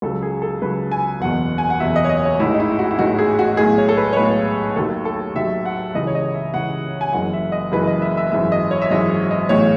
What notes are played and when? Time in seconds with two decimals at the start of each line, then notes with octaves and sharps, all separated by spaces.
0.02 C#2 C#3 F#3 A4
0.22 G#4
0.42 A4
0.62 C#2 C#3 F#3 B4
0.91 G#5
1.21 F#1 E2 B2 F#5
1.58 G#5
1.70 F#5
1.80 F#1 E2 B2 E5
1.96 D#5
2.05 C#5
2.09 D#5
2.25 C#5
2.39 A1 G#2 D#3 G#3 E4
2.54 D#4
2.60 E4
2.79 F#4
2.91 E4
2.99 A1 G#2 D#3 G#3 F#4
3.19 G#4
3.39 F#4
3.57 B1 A2 G#3 G#4
3.78 C#5
3.89 A4
3.97 B4
4.13 C#5
4.16 B1 A2 G#3 B4
4.76 D#2 D#3 F#3 A4
5.05 A4
5.35 D#2 D#3 F#3 E5
5.65 F#5
5.94 C#2 C#3 E3 D#5
6.07 C#5
6.15 D#5
6.34 E5
6.54 C#2 C#3 E3 F#5
7.01 G#5
7.13 F#1 F#2 E3 G#3 F#5
7.33 E5
7.52 D#5
7.72 F#1 F#2 E3 G#3 B4
7.87 D#5
8.02 E5
8.17 E5
8.31 G#1 F#2 E3 G#3 E5
8.52 D#5
8.71 C#5
8.82 E5
8.90 G#1 F#2 E3 G#3 D#5
9.31 D#5
9.49 B1 A2 E3 G#3 C#5